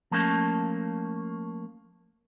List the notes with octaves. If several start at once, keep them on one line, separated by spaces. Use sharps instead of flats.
F3 A3 A#3 C#4 A5